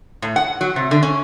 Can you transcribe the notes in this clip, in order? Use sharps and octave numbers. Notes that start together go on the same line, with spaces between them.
A2
F#5
F#3
C3
D3
C#4